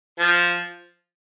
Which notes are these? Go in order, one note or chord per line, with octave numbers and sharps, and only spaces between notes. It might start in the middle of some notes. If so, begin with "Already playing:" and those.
F3